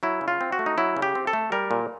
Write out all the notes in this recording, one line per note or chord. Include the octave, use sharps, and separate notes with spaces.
F#3 E4
C#3
F4
C4
F#4
A3
D#4
F#3 E4
C#3
G4
C4
A4
A3
G3 A#4
A#2